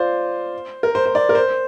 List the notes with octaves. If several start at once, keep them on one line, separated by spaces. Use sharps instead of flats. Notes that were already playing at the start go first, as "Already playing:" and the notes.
Already playing: F4 C5 D5
A#4
C5
C5
D5
A#4
C5